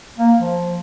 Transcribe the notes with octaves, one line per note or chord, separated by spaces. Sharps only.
A#3
F3